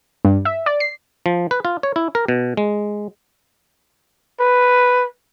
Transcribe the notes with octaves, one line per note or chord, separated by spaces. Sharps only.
G2
E5
D5
C7
F3
B4
F4
C#5
E4
A#4
B2
G#3
B4